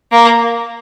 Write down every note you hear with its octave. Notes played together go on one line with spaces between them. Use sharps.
A#3